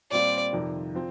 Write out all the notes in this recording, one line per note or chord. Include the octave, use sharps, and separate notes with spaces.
A#2 G3 C4 F4 D5
F2 C3 D#3
F3 C4